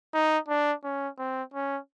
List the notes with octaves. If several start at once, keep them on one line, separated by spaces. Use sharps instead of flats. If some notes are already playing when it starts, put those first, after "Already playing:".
D#4
D4
C#4
C4
C#4